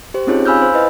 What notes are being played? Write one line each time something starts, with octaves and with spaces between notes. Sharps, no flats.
G4 C5
C4 C#4 D#4 F4 G#4 C#5
F5 G#5 B5 E6 F6 G6
C5
E4 B4 D#5